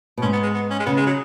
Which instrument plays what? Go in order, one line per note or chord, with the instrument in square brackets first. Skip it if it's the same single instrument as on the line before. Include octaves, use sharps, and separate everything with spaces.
[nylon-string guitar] B2
[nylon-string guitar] G#2 [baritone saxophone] C#4
[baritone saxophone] B3
G#3
B3
C#4
G#3
[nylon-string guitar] C#3 [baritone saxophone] B3
[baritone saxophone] G#3
F#3